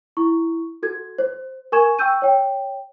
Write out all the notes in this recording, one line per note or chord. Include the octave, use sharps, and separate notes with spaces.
E4 C#6
F#4 A4 G#6
C5
A#4 G#5 C#6 G#6 E7
G5 C#6 E6 G6 D#7
C#5 G5